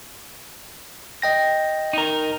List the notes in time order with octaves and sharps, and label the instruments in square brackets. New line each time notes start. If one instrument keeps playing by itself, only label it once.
[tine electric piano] D#5 G5 A#6
[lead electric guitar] D#4 A#4